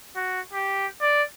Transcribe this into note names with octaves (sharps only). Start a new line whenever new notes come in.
F#4
G4
D5